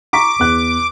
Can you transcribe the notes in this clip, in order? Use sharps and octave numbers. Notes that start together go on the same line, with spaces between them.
A#5 C#6 D6 B6
E2 F#6